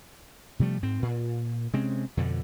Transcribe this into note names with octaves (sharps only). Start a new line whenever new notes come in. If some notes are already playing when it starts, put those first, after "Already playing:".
C3 F3 G3 A3
G#2 C4
A#2
C3 G#3 C4 C#4
F2 B2 D3